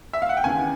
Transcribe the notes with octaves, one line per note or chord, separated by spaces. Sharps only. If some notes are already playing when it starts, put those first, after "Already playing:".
E5
F5
F#5
G5
D#2 C#3 E3 G#5